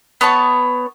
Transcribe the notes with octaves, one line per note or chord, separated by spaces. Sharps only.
B3 C#5 A5 C#6